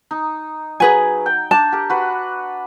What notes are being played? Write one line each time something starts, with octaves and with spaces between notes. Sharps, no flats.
D#4
F#3 G#4 B4 G#5
G5
D4 A5
G4 A#4
F#4 B4